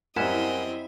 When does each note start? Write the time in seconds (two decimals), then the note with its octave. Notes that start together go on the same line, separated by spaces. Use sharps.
0.16 F#2 G3 C4 E4 A#4 D#5 F#5 G#5